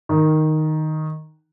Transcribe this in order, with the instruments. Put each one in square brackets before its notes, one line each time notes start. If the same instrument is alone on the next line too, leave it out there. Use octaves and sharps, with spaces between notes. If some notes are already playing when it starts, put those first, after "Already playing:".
[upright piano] D#3